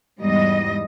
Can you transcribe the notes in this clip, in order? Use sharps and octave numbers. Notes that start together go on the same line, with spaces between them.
E2 G#2 G3 D#5